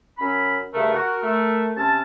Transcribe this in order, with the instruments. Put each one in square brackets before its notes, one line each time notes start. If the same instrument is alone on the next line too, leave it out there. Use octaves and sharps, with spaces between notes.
[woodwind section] F#2 C#4 B5
[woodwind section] G2 C#3 A3 [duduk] A#4
[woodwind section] F#4
A3
C3 C#4 A5